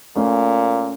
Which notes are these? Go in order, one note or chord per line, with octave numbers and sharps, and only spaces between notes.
A#2 A3 C#4